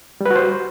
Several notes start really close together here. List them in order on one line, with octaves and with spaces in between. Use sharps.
G3 B4 F#4 C5